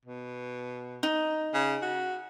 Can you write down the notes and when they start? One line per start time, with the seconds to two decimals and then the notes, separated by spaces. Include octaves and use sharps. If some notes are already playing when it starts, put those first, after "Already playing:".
0.06 B2
1.03 D#4
1.54 C#3
1.82 F#4